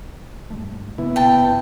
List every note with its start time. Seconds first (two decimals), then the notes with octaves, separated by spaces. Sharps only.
0.51 G2 G3 A3
0.98 C#3 A#3 B3 E4
1.16 D1 B2 G5 A5
1.36 F2 C3